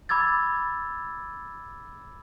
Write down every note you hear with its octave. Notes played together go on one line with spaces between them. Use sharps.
B5 D6 E6 G#6 A6